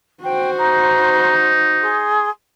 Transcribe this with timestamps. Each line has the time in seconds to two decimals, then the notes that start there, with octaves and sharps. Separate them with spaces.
0.24 F#4 C5 G5
0.58 D#4 A#5
1.80 G#4 C6